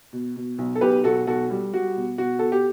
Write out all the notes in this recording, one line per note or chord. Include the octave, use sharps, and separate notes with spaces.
B2
B2
B1
A4
B1 G4 B4
B1 F#4 A4
B1 F#4 A4
G3
G3 F#4
B2
B2 F#4
B2 A4
G4